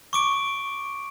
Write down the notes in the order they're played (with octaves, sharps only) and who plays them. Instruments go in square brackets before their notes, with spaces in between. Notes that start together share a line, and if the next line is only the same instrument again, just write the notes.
[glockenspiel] C#6 D6 D7